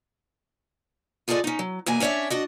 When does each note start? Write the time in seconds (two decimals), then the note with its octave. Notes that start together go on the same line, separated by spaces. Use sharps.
1.28 F4 G#4 A4 C5 D5 D#5
1.44 C#4 D#4
1.59 F#3
1.86 E2 B2 A#3 G#5
2.00 C#4 D4 C#5 D5 E5
2.30 D4 F#4 D#5